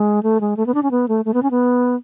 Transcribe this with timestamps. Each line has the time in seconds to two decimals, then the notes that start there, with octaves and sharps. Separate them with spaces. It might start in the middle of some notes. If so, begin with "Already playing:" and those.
Already playing: G#3
0.23 A3
0.41 G#3
0.57 A3
0.67 B3
0.74 D4
0.83 C#4
0.91 B3
1.08 A3
1.25 A3
1.34 B3
1.43 C#4
1.51 B3